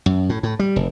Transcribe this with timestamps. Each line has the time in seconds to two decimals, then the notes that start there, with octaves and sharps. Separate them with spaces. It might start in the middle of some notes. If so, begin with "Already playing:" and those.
0.06 F#2
0.29 A2
0.43 A2
0.59 G3
0.76 F1